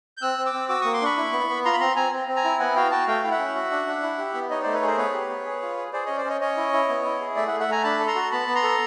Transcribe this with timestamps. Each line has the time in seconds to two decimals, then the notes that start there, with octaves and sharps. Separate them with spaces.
0.17 G6
0.22 C4 E6 F#6
0.38 C4
0.46 D6 E6
0.53 C4
0.69 F#4 D6 E6
0.81 A#3 C#6 D#6
0.93 C6 D6
1.02 D4 B5 C#6
1.17 E4
1.32 B3
1.49 B3
1.65 F4 A#5 C6
1.73 B5
1.80 C4 A#5 C6
1.96 C4 G#5 A#5
2.12 C4
2.28 C4
2.36 G#5 A#5
2.44 E4
2.60 B3 F#5 G#5
2.75 F#4 F5 G5
2.91 F#4 G5 A5
3.07 A3 F5 G5
3.24 E4
3.31 E5 F#5
3.39 C#4
3.55 F#4
3.71 D4
3.87 D4
4.03 E4
4.18 G4
4.34 B3
4.50 D#4 C#5 D#5
4.62 A3 C5 D5
4.74 B4 C#5
4.82 G#4 A#4 C5
4.98 B3 B4 C#5
5.13 G4
5.30 B3
5.46 G#4
5.62 F4
5.77 G#4
5.93 G#4 C5 D5
6.05 C#4 C#5 D#5
6.17 C5 D5
6.25 C#4 C#5 D#5
6.41 C#4 C#5 D#5
6.57 E4
6.73 E4
6.89 B3
7.04 E4
7.21 G#4
7.36 A3 D5 E5
7.48 E5 F#5
7.52 A3
7.60 E5 F#5
7.68 A3 G#5 A#5
7.83 D4 A5 B5
8.00 A4
8.07 A#5 C6
8.15 F#4
8.32 B3 A5 B5
8.48 B3
8.55 A#5 C6
8.63 A4